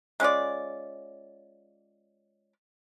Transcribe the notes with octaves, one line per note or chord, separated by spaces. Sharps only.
G#3 C#4 F4 D5